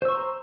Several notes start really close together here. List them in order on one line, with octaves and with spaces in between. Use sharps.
C5 E6 C#6 C6 A#5